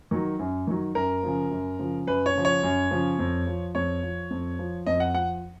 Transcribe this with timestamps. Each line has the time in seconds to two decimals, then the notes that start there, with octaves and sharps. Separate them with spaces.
0.11 D#3 F#3
0.39 F#2
0.67 D#3 F#3
0.95 F#2 A#4
1.23 C#3 F3
1.51 F#2
1.79 C#3 F3
2.07 F#2 B4
2.26 C#5
2.35 C#3 F3
2.45 C#5
2.63 F#2
2.91 C#3 F3
3.19 F2
3.47 F3
3.75 F2 C#5
4.03 F3
4.31 F2
4.59 F3
4.86 F2 D#5
5.00 F#5
5.14 F3 F#5